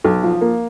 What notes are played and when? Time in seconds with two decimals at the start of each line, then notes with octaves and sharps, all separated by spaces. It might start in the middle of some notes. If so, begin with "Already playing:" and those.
0.04 B1
0.23 F3
0.41 A#3